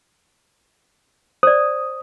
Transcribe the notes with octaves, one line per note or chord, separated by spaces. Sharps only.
C5 D5 D#6